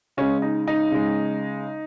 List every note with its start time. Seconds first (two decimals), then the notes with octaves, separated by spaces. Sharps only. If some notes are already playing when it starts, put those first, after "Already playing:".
0.17 C#3 G#3 C#4
0.42 D#4
0.67 D#4
0.91 C#3 G#3